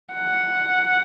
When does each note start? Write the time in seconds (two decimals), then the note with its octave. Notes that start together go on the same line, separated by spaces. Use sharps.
0.13 F#5